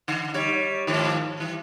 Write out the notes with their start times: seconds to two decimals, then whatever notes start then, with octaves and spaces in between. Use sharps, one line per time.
0.08 D3
0.34 G3 D#4 C#5
0.87 G#2 D#3 F3
1.37 E3 G3